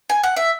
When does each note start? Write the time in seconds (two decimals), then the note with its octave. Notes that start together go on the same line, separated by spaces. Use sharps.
0.10 G#5
0.23 F#5
0.36 E5